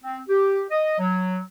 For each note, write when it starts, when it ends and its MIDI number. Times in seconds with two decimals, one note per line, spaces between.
0.04 0.19 60
0.28 0.64 67
0.70 0.97 75
0.99 1.38 54